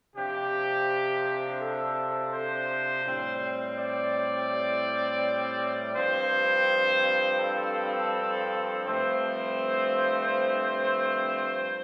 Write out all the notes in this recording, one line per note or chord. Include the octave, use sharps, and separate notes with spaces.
C3 F3 D4 G4
A4
C5
A2 G3 C4
D5
G2 F3 C4 C5
A4
G2 F3 A3 C4 C5